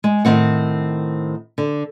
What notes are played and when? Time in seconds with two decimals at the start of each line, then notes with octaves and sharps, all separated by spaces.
0.04 G#3
0.25 A2 D#3 A#3 C4 F#5
1.58 D3